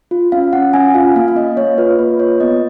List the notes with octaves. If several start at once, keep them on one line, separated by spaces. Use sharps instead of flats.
F4
C#4 F5
C#4 F#5
C#4 G#5
F4 F5
A#3 F5
F5
A#3 D#5
A#3 C#5
F4 B4
A#3 B4
F4 C#5
B3 D#5